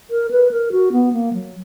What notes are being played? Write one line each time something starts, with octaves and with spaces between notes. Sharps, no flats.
A#4
B4
A#4
F#4
B3
A#3
F#3